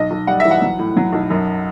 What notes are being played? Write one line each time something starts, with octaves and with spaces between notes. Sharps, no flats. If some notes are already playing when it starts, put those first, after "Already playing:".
Already playing: B1 D#5
B1
G3 F#5
E3 E5
F#5
F#3
A2
F#3
B1
F#2